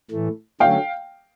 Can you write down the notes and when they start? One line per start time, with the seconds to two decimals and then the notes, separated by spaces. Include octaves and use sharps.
0.11 A2 E3 A3
0.60 D3 F#3 A3 C#4 F5 G5